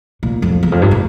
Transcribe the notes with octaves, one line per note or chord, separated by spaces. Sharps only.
A#2
F2
E2
F2
G2
A2